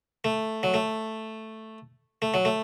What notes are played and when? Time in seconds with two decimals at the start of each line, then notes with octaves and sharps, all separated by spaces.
0.24 A3
0.63 F#3
0.74 A3
2.22 A3
2.34 F#3
2.45 A3